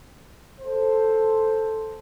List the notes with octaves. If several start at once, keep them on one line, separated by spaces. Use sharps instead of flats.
A4 C5